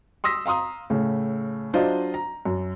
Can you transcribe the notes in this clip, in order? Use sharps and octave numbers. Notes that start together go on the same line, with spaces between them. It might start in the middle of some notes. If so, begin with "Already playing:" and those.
C6 D#6 E6 A#6 B6
F5 A#5 C6 D#6
A2 C#3
F#3 D4 F4 C5 D#5
A#5
F#2